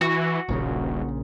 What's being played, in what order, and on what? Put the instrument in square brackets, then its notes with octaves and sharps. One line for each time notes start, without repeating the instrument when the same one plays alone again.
[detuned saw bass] E3 [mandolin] F#4
[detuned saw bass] D#1 [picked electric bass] A#1 A#2 C#3